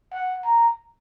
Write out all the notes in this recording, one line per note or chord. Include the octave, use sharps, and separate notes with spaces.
F#5
A#5